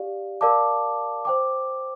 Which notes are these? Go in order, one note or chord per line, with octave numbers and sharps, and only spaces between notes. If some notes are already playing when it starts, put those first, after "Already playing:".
Already playing: G4 D5 F5
A#4 D5 F5 A5 D6
C5 G5 D6